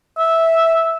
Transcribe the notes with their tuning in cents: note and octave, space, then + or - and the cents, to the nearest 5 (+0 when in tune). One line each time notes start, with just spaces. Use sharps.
E5 -5